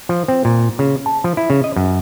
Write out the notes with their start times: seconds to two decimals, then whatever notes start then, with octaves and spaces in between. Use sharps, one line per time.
0.09 F3
0.28 C4
0.45 A#2
0.79 C#3
1.06 A5
1.24 F3
1.37 E4
1.50 C#3
1.64 D#5
1.76 F#2